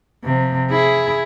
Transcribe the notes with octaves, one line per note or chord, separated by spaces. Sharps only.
C3 F3
E4 G#4